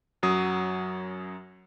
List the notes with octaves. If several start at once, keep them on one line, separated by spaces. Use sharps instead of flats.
F#2 F#3 D#6